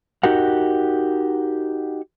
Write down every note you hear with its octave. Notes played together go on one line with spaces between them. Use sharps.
D#4 F#4 G4 A#4 F#5